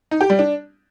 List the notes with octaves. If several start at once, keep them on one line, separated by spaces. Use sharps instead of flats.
D#4
G4
G3
D4